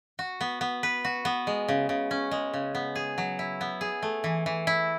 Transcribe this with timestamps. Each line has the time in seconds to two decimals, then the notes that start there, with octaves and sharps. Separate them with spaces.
0.19 F#4
0.41 B3
0.61 B3
0.83 B4
1.05 F#4
1.25 B3
1.47 G#3
1.68 C#3
1.89 C#3
2.11 C#4
2.31 G#3
2.54 C#3
2.75 B3
2.95 G#4
3.18 F#3
3.39 E4
3.61 B3
3.81 G#4
4.03 A3
4.24 E3
4.46 E3
4.67 E4